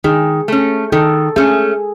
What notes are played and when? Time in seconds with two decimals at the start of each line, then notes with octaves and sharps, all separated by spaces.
0.04 D#3 G#4
0.48 A3 C#4
0.92 D#3 A4
1.36 A3 C#4 G#4